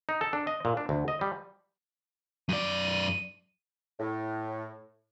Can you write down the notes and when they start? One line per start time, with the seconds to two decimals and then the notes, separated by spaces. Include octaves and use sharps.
0.09 D#4
0.21 A4
0.33 D4
0.47 D#5
0.65 A#2
0.77 D4
0.89 D2
1.08 D#5
1.21 G3
2.49 F#2 D5 D#7
3.99 A2